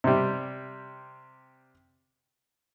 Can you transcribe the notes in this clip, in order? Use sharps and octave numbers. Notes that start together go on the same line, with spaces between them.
C3 G3